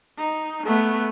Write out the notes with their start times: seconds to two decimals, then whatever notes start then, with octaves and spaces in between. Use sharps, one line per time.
0.19 D#4
0.65 A3 B3